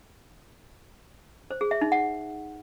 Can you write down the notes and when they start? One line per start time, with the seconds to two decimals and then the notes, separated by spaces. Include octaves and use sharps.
1.51 C5
1.61 G#4
1.71 E5
1.81 D#4
1.92 F#5